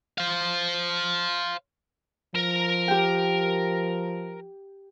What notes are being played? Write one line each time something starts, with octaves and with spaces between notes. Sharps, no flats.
C5 F5
F3 A#4 A#5
G4 G5